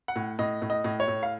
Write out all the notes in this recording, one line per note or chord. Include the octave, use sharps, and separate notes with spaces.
F#5
A2
A2 D#5
A2
D#5
A2
C#5
A2
F5